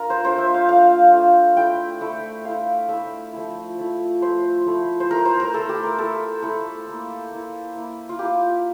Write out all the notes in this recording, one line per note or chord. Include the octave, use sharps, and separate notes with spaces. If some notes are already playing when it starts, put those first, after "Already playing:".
Already playing: D4 F4 A#4
C5
A3 D4 F4 C5
E5
F5
A3 D4 F4 F5
A3 D4 F4
A3 E4 G5
A3 E4
A3 E4 F5
A3 E4 E5
F3 A3 E4
F3 A3 E4
F3 A3 E4 C5
F3 A3 E4
C5
A3 E4 A#4
C5
A#4
A3 E4 A4
G4
A#4
A3 E4 A4
A3 E4 A4
A#3 E4
A#3 E4
A#3 E4
F4
A#3 E4 G4